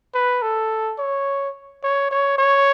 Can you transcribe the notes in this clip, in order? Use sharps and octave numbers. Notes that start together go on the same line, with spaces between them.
B4
A4
C#5
C#5
C#5
C#5